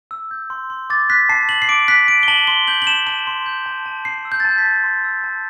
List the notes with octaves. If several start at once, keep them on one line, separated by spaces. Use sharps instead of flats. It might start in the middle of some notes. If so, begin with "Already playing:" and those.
E6
G6
C6
C6
D6 A6
F#6 B6
A5 C7
A5 F#7
C7
D6 D7
F#6 B6
A5 D7
G7
A5 F#7
C6 G7
G6 F#7
F#7
A5 E7
A5 E7
C6
G6
A5
A5
C6 C7
E6
G6
A6
A5 G6
B6
A5
C6
E6
A5